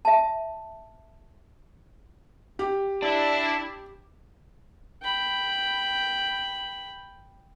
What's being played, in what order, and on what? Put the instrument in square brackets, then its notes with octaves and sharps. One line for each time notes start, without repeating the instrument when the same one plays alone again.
[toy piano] E5 A5
[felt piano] G4
[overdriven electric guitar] D4 [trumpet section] E4
[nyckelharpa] G5 B5